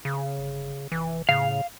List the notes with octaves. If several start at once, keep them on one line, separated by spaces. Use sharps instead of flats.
C#3
G1
F1 E3
A2 C#3 F5